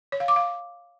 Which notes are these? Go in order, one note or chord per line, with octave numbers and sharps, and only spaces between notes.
C#5
F5
D6
F5